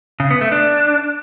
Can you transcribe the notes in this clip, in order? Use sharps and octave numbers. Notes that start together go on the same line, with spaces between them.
C#3
B3
A3
D4